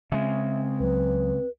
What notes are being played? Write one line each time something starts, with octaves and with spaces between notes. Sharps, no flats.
C#3 G#3 C4 E5
C#2 F#3 B4